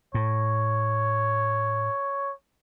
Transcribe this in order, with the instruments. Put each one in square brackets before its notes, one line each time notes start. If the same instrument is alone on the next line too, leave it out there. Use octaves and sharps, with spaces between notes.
[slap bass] A2 [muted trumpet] C#5